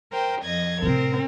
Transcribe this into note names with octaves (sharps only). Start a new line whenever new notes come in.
A#4 C5 G5
F2 D#5 G#6
A2 C3 C4 A#4